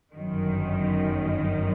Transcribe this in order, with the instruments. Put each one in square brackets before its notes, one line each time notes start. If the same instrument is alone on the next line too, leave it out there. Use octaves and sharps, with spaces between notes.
[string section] G1 F#2 D#3